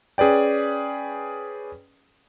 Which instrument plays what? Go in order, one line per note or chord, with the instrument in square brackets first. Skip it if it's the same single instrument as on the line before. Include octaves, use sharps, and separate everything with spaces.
[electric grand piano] C#4 G#4 B4 D5 G5